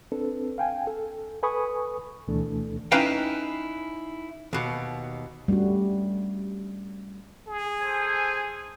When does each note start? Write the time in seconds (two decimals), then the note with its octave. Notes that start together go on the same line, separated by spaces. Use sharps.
0.12 C4 D4 A4 B4
0.58 F5 G5 G#5
0.87 A4
1.43 A4 B4 G#5 B5 C#6 D#6
2.28 D2 B2 E3 A3 D4 A4
2.92 C#4 D#4 E4 B4 F5 G5
4.53 D#2 B2
5.48 G3 A3 C#4 D4 F#4
7.48 G#4
7.81 A4 C5 G#5